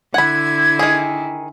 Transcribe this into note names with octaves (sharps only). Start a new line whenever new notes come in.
D3 E4 F#5 B5 G#6
D#3 G#4